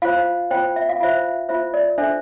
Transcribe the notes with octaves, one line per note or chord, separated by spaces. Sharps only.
F4 C5 F5
F4 C5 G5
E5
F5
F4 C5 E5
F4 C5 E5
D5
D4 A4 C5 E5